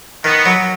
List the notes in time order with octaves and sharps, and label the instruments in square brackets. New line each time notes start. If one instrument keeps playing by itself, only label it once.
[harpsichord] D#3 [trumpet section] B3
[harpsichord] F#3